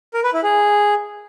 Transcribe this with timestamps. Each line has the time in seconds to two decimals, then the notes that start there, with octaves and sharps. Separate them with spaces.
0.14 A#4
0.24 B4
0.34 E4
0.43 G#4